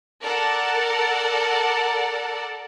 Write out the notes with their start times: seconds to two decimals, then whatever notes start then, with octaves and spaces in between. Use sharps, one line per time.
0.22 A4 A#4 D5 F#5